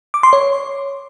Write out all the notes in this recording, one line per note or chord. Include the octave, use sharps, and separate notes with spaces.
D6
C6
C#5